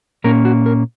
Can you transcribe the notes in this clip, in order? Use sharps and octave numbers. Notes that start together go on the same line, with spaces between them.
A#2 A#3 C#4 A#4
F#4
A#4